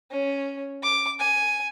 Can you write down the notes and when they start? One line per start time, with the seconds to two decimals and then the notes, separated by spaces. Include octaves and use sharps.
0.11 C#4
0.83 D6
1.20 G#5